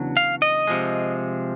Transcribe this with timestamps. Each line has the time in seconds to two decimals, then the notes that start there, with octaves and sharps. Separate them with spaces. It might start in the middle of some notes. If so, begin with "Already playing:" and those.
Already playing: E2 C#3 F#3 D4
0.17 F5
0.42 D#5
0.67 C3 F3 G#3